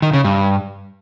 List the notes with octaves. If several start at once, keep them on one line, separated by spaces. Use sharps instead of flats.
D#3
C#3
G2